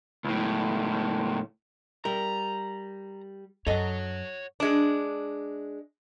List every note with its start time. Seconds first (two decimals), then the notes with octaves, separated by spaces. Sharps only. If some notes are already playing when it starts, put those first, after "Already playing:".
0.24 C#2 A2
2.05 G3 A#4 A#5
3.67 F#2 A4 C#5 D#5 F#5
4.60 G#3 D4